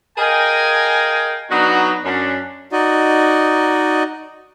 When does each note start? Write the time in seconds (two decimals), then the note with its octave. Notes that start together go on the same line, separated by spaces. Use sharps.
0.17 G#4 A#4 D#5 F5 G5 G#5
1.49 F#3 B3 D4 D#4 F#4
2.04 F#2 C#4 D4
2.72 D#4 F#4 D5 D#5